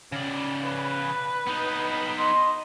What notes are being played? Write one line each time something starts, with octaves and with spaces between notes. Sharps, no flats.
C#3 D5
B4
B3 D#4
D#5 C6